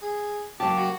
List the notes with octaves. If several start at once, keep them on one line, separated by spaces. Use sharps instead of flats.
G#4
C#3 F#3 A#3 G4 A5
F#4